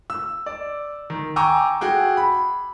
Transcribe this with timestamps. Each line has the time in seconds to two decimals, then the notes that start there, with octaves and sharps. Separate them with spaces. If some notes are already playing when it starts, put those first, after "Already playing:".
0.10 E6
0.46 D5
1.10 D#3
1.36 G5 G#5 A#5 C#6 D6 E6
1.81 F#4 G#4 G5
2.17 B5